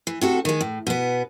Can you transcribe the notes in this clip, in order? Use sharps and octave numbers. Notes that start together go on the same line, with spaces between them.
E3
C3 F#4 A4
D#3 G#3
A2
B2 B3